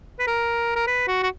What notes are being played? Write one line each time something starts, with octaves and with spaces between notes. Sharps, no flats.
B4
A#4
A#4
B4
F#4
F#4